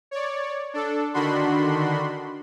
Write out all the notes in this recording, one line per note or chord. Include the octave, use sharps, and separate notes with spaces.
C#5 D5
D4 A4
D3 D#3 D4 F#4 B5 C6